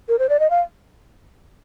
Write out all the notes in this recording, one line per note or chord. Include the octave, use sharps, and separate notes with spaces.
A#4
C5
D5
D#5
F5